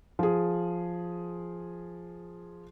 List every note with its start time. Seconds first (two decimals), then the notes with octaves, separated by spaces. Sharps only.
0.19 F3 G#4